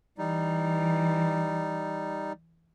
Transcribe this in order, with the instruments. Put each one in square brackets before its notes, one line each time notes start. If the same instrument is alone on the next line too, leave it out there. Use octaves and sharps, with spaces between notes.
[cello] E3 [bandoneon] G3 D#4